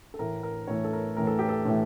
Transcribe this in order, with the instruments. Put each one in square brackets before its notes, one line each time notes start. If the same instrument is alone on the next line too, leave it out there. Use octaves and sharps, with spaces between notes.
[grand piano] A4
A2 E3 A3 A#4
A#4
A2 E3 A3 C#5
A4
A#4
A2 E3 A3 A#4
A4
G4
A4
A2 E3 A3